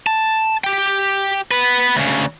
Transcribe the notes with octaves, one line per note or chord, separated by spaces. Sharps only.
A5
G4 G5
B3 B4
D2 C#3